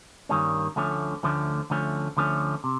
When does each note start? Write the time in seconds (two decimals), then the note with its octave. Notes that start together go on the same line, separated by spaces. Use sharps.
0.29 G2 D#3 G3 A#3 C#4
0.76 D2 D3 F3 A3 C#4
1.23 D2 D3 F3 A3 C#4
1.70 D2 D3 F3 A3 C#4
2.17 D2 D3 F3 A3 C#4
2.64 C3